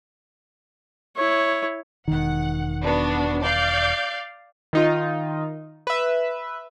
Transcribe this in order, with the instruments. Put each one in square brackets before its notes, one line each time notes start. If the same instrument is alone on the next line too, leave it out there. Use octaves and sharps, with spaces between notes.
[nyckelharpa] E4 C#5
[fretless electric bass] E1 D#3 [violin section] F#5
[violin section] B3 D4 F#4
D5 F5 G6
[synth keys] D#3 D#4 F4
B4 E5